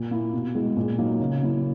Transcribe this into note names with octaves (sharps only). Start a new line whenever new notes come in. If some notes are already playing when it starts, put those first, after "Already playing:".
Already playing: A#2
A#3 E4
B2
G#3 B3 E4
A#2
F#3 A#3 D#4
C#3
F#3 A#3 E4